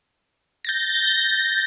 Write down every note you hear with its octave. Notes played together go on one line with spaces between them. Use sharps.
G6 A6 A#6